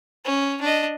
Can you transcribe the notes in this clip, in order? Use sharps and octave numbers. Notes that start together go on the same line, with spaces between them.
C#4
D4 D#5